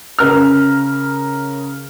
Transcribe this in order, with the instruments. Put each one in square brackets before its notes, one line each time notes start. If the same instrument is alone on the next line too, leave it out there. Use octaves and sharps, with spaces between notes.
[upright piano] C#3 A#4 F6